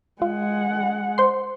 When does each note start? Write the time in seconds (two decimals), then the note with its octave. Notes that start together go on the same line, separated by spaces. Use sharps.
0.22 G#3 F4 F#5
1.18 C5 C6